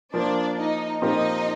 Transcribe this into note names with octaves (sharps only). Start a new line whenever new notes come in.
F3 A#3 D4 F4 C5 D5
D#4 D#5
A#2 F3 C4 D#4 G4 A#4 D#5